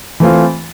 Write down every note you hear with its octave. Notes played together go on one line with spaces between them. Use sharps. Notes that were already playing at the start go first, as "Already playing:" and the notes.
E3 A3 C4 F4